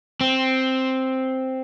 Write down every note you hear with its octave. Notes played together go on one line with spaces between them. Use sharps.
C4